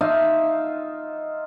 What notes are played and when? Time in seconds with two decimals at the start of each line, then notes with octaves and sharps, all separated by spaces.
0.01 D#4 F4 E5 F5